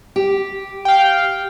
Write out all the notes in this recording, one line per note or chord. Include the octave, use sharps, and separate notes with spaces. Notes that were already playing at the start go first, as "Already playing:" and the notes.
G4
F5 G5